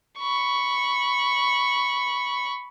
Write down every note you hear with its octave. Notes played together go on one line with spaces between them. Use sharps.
B5 C#6